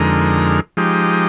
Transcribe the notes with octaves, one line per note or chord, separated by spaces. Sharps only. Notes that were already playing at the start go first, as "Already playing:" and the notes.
Already playing: F2 D3 G#3 D#4 A#4
F3 G#3 D#4 G4